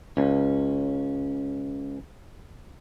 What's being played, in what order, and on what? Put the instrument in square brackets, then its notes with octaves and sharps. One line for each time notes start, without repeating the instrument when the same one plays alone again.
[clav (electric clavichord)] C#2 [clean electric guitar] C#4